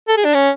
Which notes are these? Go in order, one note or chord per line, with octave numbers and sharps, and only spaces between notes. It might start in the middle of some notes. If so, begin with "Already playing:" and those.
A4
G#4
D4
C#4